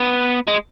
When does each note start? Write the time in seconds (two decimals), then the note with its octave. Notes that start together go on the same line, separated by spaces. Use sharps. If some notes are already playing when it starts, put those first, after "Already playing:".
Already playing: B3
0.47 G#3